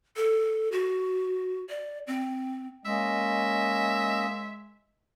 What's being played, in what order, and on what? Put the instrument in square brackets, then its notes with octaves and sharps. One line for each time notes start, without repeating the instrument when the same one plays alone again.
[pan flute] A4
F#4
D5
C4
[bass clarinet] G#3 [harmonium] A#3 C#4 D#5 [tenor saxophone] E5